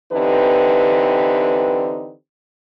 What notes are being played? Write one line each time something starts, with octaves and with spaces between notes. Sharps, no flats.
D3 E3 C4 D#4 G4 B4